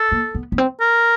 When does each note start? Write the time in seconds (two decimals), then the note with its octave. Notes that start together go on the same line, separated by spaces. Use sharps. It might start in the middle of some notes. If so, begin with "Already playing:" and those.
Already playing: A4
0.12 A#3
0.35 B3
0.52 B3
0.58 C4
0.81 A#4